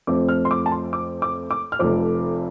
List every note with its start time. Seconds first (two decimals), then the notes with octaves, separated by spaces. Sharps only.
0.07 F2 F3 A3 C4 D6
0.28 F6
0.45 C6
0.51 D6
0.66 A5
0.72 C6
0.93 D6
1.22 D6
1.51 D6
1.72 F6
1.79 F1 F2 F3 C4 D6